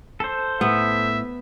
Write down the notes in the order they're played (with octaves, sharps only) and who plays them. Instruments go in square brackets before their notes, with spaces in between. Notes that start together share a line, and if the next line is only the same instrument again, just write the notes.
[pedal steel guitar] A4 C5
[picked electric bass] A2 [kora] B3 [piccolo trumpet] E5